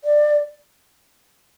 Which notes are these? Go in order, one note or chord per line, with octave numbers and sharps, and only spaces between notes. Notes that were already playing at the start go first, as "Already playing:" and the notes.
D5